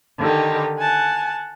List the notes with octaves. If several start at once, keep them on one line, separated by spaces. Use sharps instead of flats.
D3 D#3 D#4 G4
F#5 G#5 A5